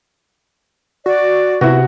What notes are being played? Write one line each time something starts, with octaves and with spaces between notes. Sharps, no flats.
F#4 D5
C3 B3 E4 F#4